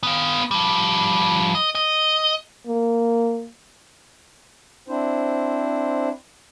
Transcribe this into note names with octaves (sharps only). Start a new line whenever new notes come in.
B3 F5
F3 G3
D#5
D#5
A#3
C4 D4 E4 C5